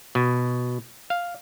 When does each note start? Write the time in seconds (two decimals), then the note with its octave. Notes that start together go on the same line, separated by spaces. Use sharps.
0.15 B2
1.10 F5